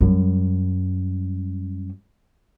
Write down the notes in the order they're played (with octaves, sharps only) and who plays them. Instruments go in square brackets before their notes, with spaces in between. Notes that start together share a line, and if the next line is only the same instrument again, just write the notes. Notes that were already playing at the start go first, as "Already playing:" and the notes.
[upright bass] F#2 G3